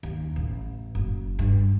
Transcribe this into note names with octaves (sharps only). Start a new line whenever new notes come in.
D#2
A1
F#1
G2